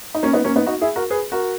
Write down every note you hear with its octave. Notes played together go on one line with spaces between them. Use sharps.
D#4
A#3 C#4
B3 D#4
A#3 C#4
B3 D#4
D#4 F#4
E4 G#4
F#4 A#4
G#4 B4
F#4 A#4